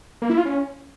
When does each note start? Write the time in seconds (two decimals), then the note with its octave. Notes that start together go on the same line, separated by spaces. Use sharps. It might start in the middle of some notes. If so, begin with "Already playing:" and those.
0.22 A#3
0.30 E4
0.38 F4
0.46 C#4